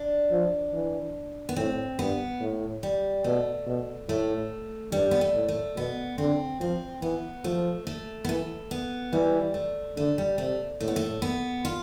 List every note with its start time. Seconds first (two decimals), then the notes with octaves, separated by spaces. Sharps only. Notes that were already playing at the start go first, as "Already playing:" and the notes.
Already playing: D4
0.31 F3
0.73 E3
1.49 B3
1.56 A2 C4
1.99 G2 B3
2.40 A2
2.83 G3
3.24 B2 A3
3.66 B2
4.08 A2 A3
4.92 G2 G3
5.11 B3
5.21 A3
5.34 A2
5.48 A3
5.76 B2 B3
6.18 D3 C4
6.60 F3 C4
7.02 E3 B3
7.44 F3 A3
7.87 A3
8.25 B3
8.28 E3 A3
8.71 B3
9.13 E3 G3
9.54 A3
9.97 D3 A3
10.18 G3
10.38 C3 A3
10.80 A2 A3
10.88 B3
10.96 A3
11.22 B3
11.65 F4